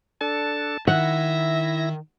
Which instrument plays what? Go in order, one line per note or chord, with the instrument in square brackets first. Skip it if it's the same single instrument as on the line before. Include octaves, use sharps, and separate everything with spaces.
[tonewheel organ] D4 A4 [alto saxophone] A5
[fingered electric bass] D#3 [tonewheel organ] E4 A#6 [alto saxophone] E5 [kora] F#5